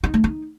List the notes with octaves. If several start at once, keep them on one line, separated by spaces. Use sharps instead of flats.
D#4
A3
D#4